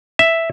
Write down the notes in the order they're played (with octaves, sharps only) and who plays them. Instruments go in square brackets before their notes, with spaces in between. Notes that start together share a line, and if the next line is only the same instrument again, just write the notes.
[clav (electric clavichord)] E5